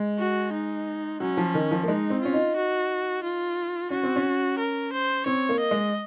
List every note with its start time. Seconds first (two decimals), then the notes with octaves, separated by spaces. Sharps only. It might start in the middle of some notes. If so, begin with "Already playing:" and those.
Already playing: G#3
0.19 F#4
0.53 D#4
1.20 F#3 C#4
1.37 F3
1.54 D#3
1.71 F3
1.83 A#3
1.88 G#3 D#4
2.10 C4
2.21 C#4 F4
2.33 D#4
2.56 F#4
3.23 F4
3.90 C#4 F#4
4.03 C4
4.16 C#4
4.59 A#4
4.93 C5
5.26 C4 C#5
5.49 A#3
5.60 D#5
5.71 G#3